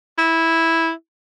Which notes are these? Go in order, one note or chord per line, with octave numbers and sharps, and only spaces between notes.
E4